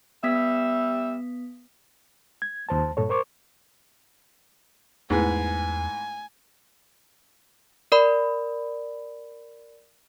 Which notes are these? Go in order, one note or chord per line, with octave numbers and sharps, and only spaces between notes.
G3 B3 E5 D#6 B6
G#6
D#2 C5 A5
G2 A#2 A4 C#5
A#4 C5 C#6 D6
E2 G#2 A3 B3 E4 G#4 G#5
A#4 D5 B5